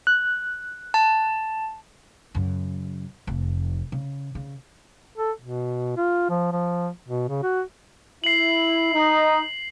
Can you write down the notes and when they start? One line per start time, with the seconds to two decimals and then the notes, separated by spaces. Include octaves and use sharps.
0.07 F#6
0.94 A5
2.35 F#2 C#3
3.27 F1 F2
3.92 C#3
4.35 C#3
5.18 A4
5.41 B2
5.97 F4
6.29 F3
6.52 F3
7.08 B2
7.28 C#3
7.43 F#4
8.24 E4 C7 F#7
8.94 D#4